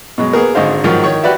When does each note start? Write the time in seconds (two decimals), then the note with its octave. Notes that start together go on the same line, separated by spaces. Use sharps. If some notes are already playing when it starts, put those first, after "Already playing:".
0.18 B2 F#3 G#3
0.33 A#3 B3 G#4 A#4
0.55 G#1 D3 G#3 D#4 C5 F5
0.84 G#2 D#3 F3 F#3
1.04 D#3 C#5 C#6
1.23 F#4 G4 B4 D5 E5